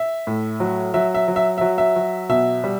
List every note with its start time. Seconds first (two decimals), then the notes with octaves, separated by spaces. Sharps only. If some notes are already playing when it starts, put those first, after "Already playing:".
Already playing: E5
0.27 A2
0.60 F#3
0.94 F#3 E5
1.15 E5
1.28 F#3
1.36 E5
1.58 F#3 E5
1.78 E5
1.96 F#3
2.29 B2 E5
2.64 G3